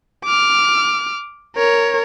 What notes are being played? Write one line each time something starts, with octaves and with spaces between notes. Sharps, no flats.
D6 F6
A#4 C#5